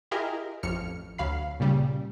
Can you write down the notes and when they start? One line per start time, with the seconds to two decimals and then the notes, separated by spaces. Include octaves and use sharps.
0.11 E4 F4 G4 G#4 A#4 D#5
0.63 A1 F2 F6 C#7
1.18 D2 F#3 F5 B5 C7
1.60 A#2 C#3 G3